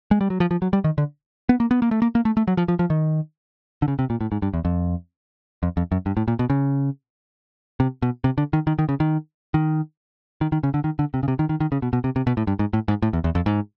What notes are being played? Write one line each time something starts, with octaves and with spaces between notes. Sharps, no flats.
G#3
G3
F#3
F3
F3
F#3
G3
D#3
D3
B3
A#3
B3
A#3
A3
A#3
A#3
A3
A3
F#3
F3
F3
F3
D#3
D3
C#3
C3
A#2
A2
G#2
G2
E2
F2
F2
F2
F#2
G2
A2
A#2
B2
C#3
C3
B2
C3
D3
D#3
D#3
D#3
C#3
D#3
D#3
D#3
D#3
C#3
D3
D#3
D3
C3
C#3
C3
D#3
D#3
D#3
C#3
B2
B2
C3
C3
B2
A2
G2
G#2
A2
G#2
A2
E2
E2
F2
G#2